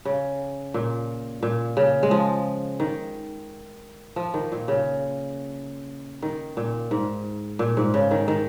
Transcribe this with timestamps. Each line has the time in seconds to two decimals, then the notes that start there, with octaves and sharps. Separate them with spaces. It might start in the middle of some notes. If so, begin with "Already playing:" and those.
0.05 C#3
0.74 A#2
1.43 A#2
1.77 C#3
2.03 G#3
2.11 F3
2.80 D#3
4.16 F3
4.34 D#3
4.52 A#2
4.68 C#3
6.22 D#3
6.57 A#2
6.91 G#2
7.59 A#2
7.77 G#2
7.94 C#3
8.11 D#3
8.28 D#3